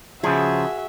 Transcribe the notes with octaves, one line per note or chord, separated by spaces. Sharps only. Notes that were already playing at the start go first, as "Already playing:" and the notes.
C#3 F3 F#4 G#4 E5